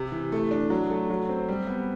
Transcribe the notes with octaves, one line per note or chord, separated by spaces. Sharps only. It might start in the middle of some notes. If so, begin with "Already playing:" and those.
Already playing: C3
E3
A3
D4
F#3
A3
F#3
C4
G3
B3